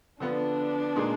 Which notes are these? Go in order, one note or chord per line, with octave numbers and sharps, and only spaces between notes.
D3 F3 B3 D4
A#2 G#3 D#4 G#4